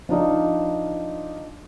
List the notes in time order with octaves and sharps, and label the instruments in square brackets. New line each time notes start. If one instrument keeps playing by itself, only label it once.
[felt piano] F3 D4 D#4 F4